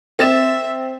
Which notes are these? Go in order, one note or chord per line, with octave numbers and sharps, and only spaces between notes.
C4 E5 A6 E7